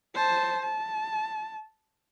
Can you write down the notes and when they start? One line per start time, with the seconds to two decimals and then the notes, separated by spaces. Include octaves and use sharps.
0.15 C5 A5
0.62 A5